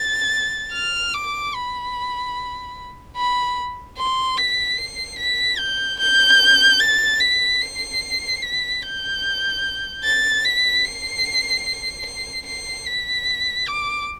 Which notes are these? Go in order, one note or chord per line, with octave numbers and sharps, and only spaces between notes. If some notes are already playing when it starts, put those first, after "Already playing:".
Already playing: A6
F6
D6
B5
B5
C6
B6
C7
B6
G6
G6
A6
B6
C7
B6
G6
A6
B6
C7
C7
C7
B6
D6